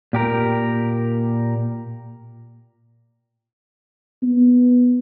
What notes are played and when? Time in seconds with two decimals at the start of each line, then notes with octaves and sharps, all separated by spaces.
0.13 A#2 G4 A#4
4.23 B3